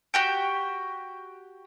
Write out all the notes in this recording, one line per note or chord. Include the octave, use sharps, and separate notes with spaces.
F#4 G4 G5